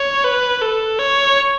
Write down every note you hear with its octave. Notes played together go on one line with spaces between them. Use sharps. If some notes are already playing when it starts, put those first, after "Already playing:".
Already playing: C#5
B4
A4
C#5